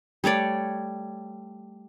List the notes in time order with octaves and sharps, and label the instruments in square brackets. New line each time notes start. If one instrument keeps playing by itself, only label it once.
[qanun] G3 A3 C#5 D5